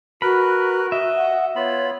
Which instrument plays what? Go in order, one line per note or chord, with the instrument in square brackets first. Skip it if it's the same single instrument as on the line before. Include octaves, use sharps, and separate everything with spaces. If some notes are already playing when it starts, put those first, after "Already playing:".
[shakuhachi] F#4 [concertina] A#4 B4 [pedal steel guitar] B5
[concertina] D#5 [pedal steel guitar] E5
[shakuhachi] F#5
[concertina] B3 F4 B5 [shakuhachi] C#5